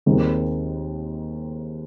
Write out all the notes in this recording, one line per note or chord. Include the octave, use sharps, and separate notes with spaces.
D#2 D#3 G#3 C4